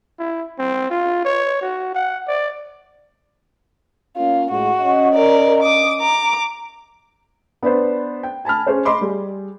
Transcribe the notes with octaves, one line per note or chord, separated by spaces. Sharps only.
E4
C4
F4
C#5
F#4
F#5
D5
A#3 C#4 F4
A2 G#3 F#4
C#4 D#5
A#4 D5
D6 D#6
A#5 D6
B3 D4 B4 C5
G5
G#5 A5 B5 F6
C#4 G#4 C5 C#5
D#5 B5 C6 D6
G3 G#4